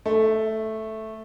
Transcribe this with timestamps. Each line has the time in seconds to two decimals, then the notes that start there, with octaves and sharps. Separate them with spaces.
0.06 A3